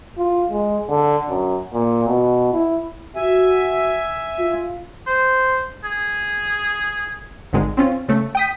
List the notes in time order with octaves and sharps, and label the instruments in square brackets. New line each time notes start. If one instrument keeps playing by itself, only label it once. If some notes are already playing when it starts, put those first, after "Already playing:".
[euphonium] F4
G#3
D3
F#2
A#2
B2
E4
[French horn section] F#4 [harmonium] E5 G#5
[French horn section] F4
[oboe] C5
G#4
[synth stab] G#1 D3 D#3 G#3
C4 C#4 F4
C#3 A3
G5 D#6 B6